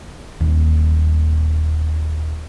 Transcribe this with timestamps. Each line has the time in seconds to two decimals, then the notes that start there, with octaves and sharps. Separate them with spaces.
0.40 D#1 D#2